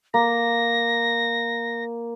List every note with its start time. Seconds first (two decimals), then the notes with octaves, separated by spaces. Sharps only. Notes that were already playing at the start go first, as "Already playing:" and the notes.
0.14 A#3 A#6